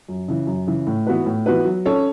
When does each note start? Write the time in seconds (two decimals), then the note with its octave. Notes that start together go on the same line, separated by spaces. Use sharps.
0.09 F#2
0.28 C#3 E3
0.47 F#2
0.67 C#3 E3
0.87 A2
1.07 E3 B3 F#4 B4
1.26 A2
1.46 E3 B3 F#4 B4
1.65 F#3
1.86 C#4 A4 C#5